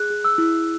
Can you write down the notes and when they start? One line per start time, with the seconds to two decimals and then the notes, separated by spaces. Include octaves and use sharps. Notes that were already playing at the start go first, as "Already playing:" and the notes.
Already playing: G#4 F#6
0.10 G#4
0.25 E6
0.38 E4